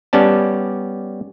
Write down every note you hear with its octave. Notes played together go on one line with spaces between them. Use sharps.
G3 B3 C#4 D5 A5